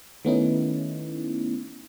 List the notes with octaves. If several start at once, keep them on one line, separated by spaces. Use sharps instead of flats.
D#3 A3 B3 C#4 D#4 E4